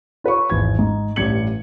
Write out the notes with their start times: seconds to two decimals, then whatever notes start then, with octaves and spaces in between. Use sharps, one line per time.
0.24 F4 B4 C#5 C#6
0.50 G#1 E2 G#6
0.79 G#2
1.16 A1 G2 G3 G#6 C#7 F#7